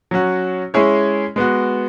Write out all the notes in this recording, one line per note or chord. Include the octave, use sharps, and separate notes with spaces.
F#3 C#4 F#4
G#3 C#4 E4 G#4 C#5
G#3 B3 F#4